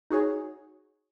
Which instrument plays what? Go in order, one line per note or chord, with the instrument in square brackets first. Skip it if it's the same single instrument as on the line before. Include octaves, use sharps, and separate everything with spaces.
[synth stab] D#4 F#4 G#4 C#5